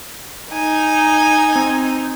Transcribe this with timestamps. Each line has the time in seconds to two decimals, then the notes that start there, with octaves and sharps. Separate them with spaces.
0.52 D#4 G#5
1.53 C4 G#6